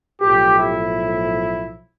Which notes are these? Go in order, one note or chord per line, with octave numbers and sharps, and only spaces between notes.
B1 A2 F3 G4
E4